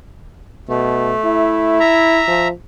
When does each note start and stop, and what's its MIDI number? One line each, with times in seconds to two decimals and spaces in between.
0.69 1.14 47
0.69 1.78 57
1.25 2.21 64
1.80 2.48 76
1.80 2.48 82
2.28 2.51 53